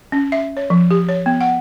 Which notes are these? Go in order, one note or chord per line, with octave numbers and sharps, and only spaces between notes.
C#4
E5
C#5
F3
G4
C#5
B3
F#5